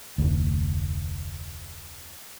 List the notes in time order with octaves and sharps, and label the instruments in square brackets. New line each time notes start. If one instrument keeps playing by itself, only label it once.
[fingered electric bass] F1 D2